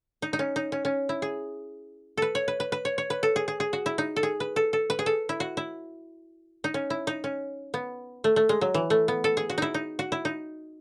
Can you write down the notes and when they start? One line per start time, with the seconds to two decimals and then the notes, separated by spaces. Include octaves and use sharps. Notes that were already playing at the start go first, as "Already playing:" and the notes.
0.22 D#4
0.33 D#4
0.39 C#4
0.56 D#4
0.72 C#4
0.85 C#4
1.09 E4
1.22 G#4
2.17 A4 B4
2.35 C#5
2.48 B4
2.60 B4
2.72 B4
2.85 C#5
2.98 C#5
3.10 B4
3.23 A4
3.36 G#4
3.48 G#4
3.60 G#4
3.73 F#4
3.86 E4
3.98 D#4
4.16 A4
4.23 G#4
4.40 B4
4.56 A4
4.73 A4
4.90 B4
4.99 G#4
5.06 A4
5.29 E4
5.40 F#4
5.57 E4
6.64 D#4
6.74 C#4
6.90 E4
7.07 D#4
7.24 C#4
7.74 B3
8.24 A3
8.36 A3
8.49 G#3
8.61 F#3
8.74 E3
8.90 A3
9.08 B3
9.24 A4
9.37 G#4
9.50 F#4
9.58 D#4 E4
9.74 D#4
9.99 F#4
10.12 E4
10.25 D#4